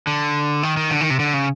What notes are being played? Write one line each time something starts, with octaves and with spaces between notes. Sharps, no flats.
D3
D#3
D#3
D3
D#3
C3
D3
C#3